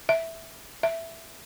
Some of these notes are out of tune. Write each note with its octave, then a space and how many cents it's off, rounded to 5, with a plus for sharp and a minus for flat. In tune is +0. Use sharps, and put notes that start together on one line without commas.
E5 -5
E5 +5